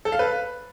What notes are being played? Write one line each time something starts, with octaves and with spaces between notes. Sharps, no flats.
A4
F5
B4